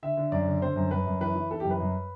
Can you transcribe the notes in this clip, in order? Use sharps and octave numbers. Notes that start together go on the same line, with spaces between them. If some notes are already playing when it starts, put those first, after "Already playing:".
D3 E5
D3
F#2 D5
D3
D3 C5
F#2
F#2 B4
F#2
E3 B4
E3
E3 A4
G4
F#2
B4
F#2